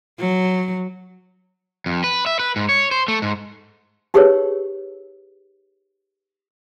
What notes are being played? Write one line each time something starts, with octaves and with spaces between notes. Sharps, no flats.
F#3
F2
B4
E5
B4
G#2
C#5
C5
A3
G#2
D#4 G4 G#4 A#4 B4 C#5